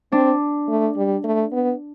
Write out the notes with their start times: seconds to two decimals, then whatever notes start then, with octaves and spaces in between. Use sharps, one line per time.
0.12 C4 D4
0.68 A3
0.96 G3
1.24 A3
1.52 B3